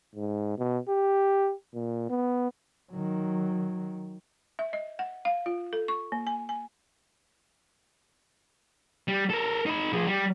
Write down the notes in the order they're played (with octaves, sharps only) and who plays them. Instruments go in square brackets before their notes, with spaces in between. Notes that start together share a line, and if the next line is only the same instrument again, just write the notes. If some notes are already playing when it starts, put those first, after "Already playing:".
[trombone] G#2
B2
G4
A#2
B3
[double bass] D#3 F#3
[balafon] E5
D#5
F#5
F5
F4
A4
C#6
A#3
G#5
G#5
[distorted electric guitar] G3
A4 A#4
D#4 B5
F3 G#4
G3